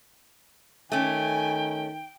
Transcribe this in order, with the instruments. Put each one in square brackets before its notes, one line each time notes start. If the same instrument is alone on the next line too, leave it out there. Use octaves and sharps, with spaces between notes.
[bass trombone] D#3 [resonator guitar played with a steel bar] A3 C#4 [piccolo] G5 [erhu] G#5